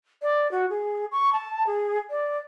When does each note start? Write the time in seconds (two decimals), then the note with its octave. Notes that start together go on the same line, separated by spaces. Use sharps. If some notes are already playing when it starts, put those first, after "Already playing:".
0.22 D5
0.51 F#4
0.70 G#4
1.12 C#6
1.33 A5
1.67 G#4
2.10 D5